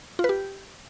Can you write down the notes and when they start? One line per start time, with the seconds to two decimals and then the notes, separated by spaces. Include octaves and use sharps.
0.19 F4
0.24 B4
0.29 G4